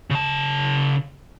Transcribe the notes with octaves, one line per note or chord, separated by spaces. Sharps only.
C#3 A5